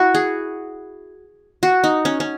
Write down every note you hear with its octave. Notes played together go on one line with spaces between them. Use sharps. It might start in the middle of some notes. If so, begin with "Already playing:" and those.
Already playing: E4 F#4
G#4
F#4
D#4
C#4
C#4